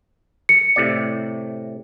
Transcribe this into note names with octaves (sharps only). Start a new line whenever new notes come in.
C#7
A2 C3 D5